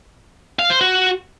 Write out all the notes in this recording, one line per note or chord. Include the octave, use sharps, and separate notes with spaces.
F5
C5
F#4